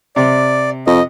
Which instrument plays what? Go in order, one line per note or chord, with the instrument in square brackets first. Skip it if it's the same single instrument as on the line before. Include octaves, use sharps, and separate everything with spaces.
[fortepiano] C3 [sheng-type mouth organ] D5
[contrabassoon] F2 [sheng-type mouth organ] D#5